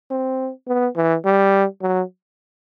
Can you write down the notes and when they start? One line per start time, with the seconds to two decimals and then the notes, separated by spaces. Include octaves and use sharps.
0.10 C4
0.67 B3
0.96 E3
1.25 G3
1.81 F#3